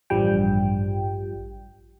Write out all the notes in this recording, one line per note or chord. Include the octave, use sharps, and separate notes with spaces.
A1 G2 F3 G3 G5